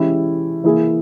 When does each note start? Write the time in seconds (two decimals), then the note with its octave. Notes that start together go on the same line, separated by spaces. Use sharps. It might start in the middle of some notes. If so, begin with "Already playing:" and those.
Already playing: E3 G#3 C#4 E4 G4
0.64 E3 A#3 E4 G#4